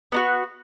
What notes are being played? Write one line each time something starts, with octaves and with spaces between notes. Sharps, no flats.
B3 D#4 F#4